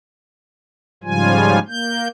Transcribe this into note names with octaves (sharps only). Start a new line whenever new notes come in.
G#2 C#3 F3 G3 F4 G#5
A#3 G6